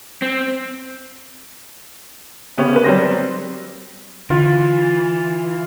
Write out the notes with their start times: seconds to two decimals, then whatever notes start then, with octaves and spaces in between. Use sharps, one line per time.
0.22 C4
2.58 C#3 B3 G4 C#5
2.73 A#3 G4 B4
2.84 F#3 G3 C4 A#6
4.30 D3 E3 F4